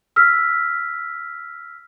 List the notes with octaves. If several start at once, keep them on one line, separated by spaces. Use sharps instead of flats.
E6 F6 B6